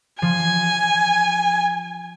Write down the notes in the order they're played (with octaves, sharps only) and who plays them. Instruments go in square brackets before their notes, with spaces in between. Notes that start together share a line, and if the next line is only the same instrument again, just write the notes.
[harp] F3 [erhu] G#5